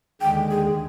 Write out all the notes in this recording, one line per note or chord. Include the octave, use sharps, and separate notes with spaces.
D#2 D3 G#3 G5
G#4